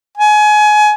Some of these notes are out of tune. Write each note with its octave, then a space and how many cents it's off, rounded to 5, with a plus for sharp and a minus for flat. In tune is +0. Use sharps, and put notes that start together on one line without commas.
G#5 +25